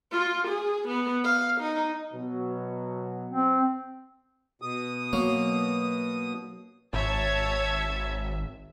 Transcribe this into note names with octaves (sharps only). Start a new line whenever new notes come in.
F4
G#4
B3
F5
D#4
B2 F#3
C4
B2 D#6
F#3 A#3
G#1 C#5 E5 A5 G#6